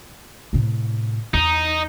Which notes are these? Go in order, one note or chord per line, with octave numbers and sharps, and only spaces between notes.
A2 C3
E2 D#4